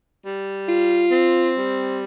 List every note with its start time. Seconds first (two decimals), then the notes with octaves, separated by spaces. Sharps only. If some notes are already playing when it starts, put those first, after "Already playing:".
0.25 G3
0.68 F4
1.11 C4
1.54 G3